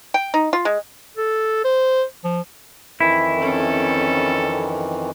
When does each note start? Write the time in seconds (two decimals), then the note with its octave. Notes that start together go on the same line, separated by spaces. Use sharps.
0.14 G5
0.34 D#4
0.53 F4
0.65 G#3
1.17 A4
1.64 C5
2.25 F3
3.00 F2 D#3 E3 E4
3.38 C4 C#4 A4